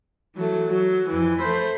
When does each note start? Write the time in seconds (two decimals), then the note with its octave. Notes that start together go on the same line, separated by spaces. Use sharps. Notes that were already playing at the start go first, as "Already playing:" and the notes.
0.35 E3 F#3 A3
0.68 F#3
1.09 F2 E3
1.40 A3 C5 B5